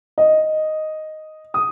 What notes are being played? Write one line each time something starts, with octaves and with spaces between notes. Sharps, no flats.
D#5
D#6